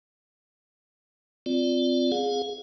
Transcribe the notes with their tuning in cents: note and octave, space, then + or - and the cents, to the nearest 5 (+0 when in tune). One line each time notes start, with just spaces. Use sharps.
C4 -15 F4 +0 D5 -5
G#4 +0 F5 +35